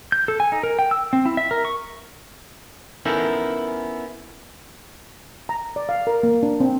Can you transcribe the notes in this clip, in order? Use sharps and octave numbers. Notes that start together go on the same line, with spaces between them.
G6
A4
G#5
D#4
A#4
G5
E6
C4
E4
E5
A#4
C#6
B3 C#4 D#4 E4 A4 A#4
A#5
D5
F5
A#4
A#3
D4
C4